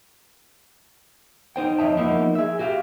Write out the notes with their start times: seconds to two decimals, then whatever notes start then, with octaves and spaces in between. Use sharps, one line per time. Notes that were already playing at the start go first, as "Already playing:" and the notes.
1.56 D#4 C5 G5
1.78 F2 F3 C#5 D#5 E5 A5
1.97 F3 A#3 B3 D#4 E4
2.35 G#4 E5
2.59 F#4 G4 E5 F5